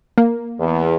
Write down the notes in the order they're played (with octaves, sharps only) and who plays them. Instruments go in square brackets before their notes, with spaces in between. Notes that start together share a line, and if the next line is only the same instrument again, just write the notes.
[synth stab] A#3
[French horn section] E2